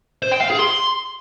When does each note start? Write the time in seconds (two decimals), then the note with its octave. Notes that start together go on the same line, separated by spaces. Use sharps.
0.22 C5
0.32 G5
0.41 F5
0.50 G#4
0.59 C6